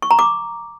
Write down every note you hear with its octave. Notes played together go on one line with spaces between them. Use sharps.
C#6
A#5
D6